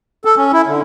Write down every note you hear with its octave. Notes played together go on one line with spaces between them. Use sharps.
A4
C#4
E4
D3